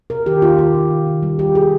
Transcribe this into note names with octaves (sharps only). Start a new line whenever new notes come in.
C3 A#4
D#3 G4
A#3 F4
D#3 F4
C3
D#3
D#3
G3
C3 G4
C3 G#4